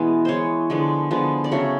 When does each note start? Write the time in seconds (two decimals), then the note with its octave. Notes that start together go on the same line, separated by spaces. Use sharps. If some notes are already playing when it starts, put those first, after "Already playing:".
Already playing: B2 E3 G#3 B3
0.25 E3 G#3 B3 C5 C#5
0.70 D3 F3 G#3 B3
1.11 D3 F3 G#3 B3
1.44 D5
1.51 C#3 F#3 A3 C#5